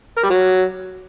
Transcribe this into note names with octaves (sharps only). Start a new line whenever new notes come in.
A#4
G3
F#3